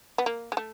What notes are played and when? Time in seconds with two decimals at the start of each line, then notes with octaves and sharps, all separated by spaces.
0.18 B3
0.26 A#3
0.52 G#3
0.57 A3